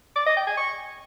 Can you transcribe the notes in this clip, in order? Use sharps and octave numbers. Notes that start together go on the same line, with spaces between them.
D6
D#5
G5
G#5
C#6